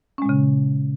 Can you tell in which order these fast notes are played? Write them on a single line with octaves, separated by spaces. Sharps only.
C#4 G#3 A#2 C#3